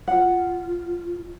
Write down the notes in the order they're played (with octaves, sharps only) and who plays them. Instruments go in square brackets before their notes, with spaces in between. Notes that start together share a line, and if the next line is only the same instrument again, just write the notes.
[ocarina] F4 [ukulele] F#5